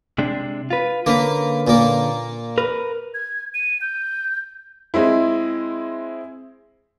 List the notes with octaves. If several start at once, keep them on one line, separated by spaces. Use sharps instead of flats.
C3 G#3 D4
F4 B4
D3 A#3 C#4 B4
A#2 A#3
A#4 B4
G#6
D#7
G6
G#3 C4 E4